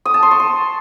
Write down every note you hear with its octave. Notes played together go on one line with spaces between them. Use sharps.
D#6
A5
C6
C#6
C6